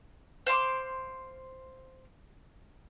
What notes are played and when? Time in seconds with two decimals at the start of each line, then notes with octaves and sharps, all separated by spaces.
0.47 C5 F5 C6 D6